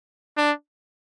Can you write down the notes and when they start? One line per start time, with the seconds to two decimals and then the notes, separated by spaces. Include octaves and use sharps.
0.37 D4